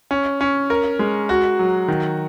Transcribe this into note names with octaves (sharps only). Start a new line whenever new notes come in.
C#4
C#4
A#4
G#3
F#4
F#3
D#3